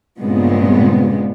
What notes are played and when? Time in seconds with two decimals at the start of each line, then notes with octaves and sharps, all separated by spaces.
0.20 G2 A#2 C#3 G#3 B3 C4